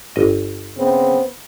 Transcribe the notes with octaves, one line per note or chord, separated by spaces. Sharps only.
G1 D#5
C#3 B3 C4